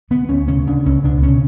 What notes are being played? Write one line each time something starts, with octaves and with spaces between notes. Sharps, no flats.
D3 B3
D2 C#4
C#3 C#4
C#3 D4
C#2 C#4
C#3 D4
B2 C#4